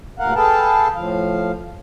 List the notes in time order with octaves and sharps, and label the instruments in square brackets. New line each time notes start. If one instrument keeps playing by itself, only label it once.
[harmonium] D2 G2 A#2 A#4 F5 F#5
G#4 A4 B4 F5 G5 A5
A2 F3 F5